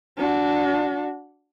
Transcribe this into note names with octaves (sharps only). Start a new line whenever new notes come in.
D4 F#4